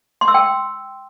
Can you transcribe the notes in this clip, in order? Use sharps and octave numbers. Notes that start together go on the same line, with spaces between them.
C6
E6
G5